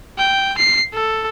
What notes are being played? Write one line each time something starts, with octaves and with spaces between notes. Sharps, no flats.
G5
C7
A4